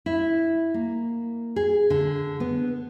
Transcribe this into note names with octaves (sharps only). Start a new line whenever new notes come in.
E4
A#3
G#4
D3
B3